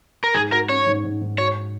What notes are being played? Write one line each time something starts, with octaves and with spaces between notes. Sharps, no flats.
A#4
G#2 G#4
F#4 A#4
C#4 C#5
G#2
G#2
G#2
F#4 C#5